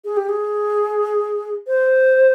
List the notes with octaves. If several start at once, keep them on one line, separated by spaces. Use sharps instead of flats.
G#4
G4
G#4
C5